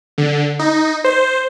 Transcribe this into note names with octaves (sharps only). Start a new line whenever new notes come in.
D3
D#4
C5